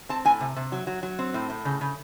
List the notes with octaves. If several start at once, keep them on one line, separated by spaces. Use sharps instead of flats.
C4 A5
A2 G#5
C3
C3
F#3
F#3
F#3
C4
A2
A2
C#3
C#3